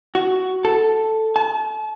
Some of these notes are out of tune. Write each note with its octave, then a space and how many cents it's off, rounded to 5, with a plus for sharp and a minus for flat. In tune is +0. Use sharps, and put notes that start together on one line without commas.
F#4 +10
A4 +0
A5 -35